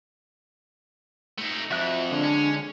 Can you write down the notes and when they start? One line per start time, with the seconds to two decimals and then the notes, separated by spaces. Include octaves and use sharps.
1.38 A3 D#4
1.71 F2 F#4 E5 F#6
2.11 D3 G#3 D4
2.23 C#4